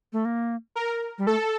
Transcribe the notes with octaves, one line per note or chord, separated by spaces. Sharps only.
A3
A#3
A#4
G3
A3 A4